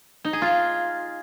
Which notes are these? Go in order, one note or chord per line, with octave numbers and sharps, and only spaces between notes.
D#4
G#4
F4